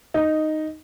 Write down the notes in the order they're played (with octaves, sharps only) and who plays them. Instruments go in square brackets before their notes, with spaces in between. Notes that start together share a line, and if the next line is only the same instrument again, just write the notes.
[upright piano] D#4